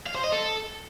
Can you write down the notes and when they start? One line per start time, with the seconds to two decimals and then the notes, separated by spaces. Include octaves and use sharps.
0.06 F5
0.15 C5
0.24 D#5
0.32 A4